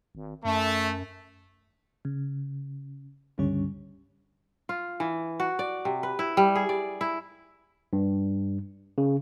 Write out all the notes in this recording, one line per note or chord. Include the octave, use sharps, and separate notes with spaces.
G#1
F#2 A3
C#3
C#2 G2 D3 G3 C#4 C#5
F4
E3
F#4
D5
C3
B4
E4
G3
G#4
D5
E4
G2
C#3